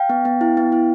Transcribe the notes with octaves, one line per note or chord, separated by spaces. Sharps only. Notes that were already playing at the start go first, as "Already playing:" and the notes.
Already playing: F5 G5
B3
B3
E4
B3
E4